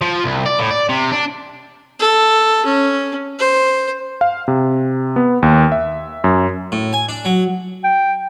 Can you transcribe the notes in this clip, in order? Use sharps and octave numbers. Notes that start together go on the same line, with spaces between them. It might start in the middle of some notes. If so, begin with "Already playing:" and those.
F3
C2
D5
A2
D5
C3
D4
A4
C#4
C5
F5
C3
B3
D#2
E5
F#2
A2
G#5
D4
F#3
G5